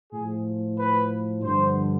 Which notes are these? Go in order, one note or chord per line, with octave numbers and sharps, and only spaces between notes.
A2 F3 G#4
B4
G2 D3 F3 C5